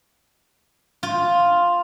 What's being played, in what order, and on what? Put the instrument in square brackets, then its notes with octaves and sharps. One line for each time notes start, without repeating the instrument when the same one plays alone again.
[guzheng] F4